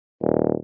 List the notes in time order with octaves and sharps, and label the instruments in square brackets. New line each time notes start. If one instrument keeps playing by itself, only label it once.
[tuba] D#1